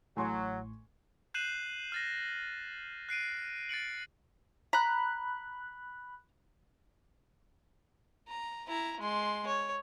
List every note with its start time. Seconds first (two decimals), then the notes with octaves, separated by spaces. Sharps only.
0.17 A1 A2 F#3 G#5 C6 C#6
1.34 F#6 G6 C7 D#7 E7 F#7
1.92 F6 A6 A#6
3.09 F#6 C7 D7 D#7
3.69 A6 C#7 D7 F#7
4.73 A#5 B5 F#6
8.28 A#5
8.68 E4 A#5
9.00 G#3 C6
9.47 C#5